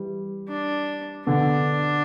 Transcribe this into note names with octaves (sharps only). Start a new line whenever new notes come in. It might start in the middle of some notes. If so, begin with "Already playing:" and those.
Already playing: E3 G3
D4
B2 D3 D4